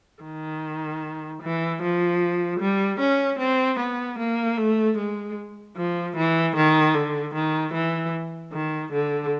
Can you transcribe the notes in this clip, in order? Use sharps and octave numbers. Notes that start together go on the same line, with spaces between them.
D#3
E3
F3
G3
C#4
C4
B3
A#3
A3
G#3
F3
E3
D#3
D3
D#3
E3
D#3
D3